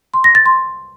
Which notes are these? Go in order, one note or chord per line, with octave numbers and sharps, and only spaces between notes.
C6
A#6
A6
C6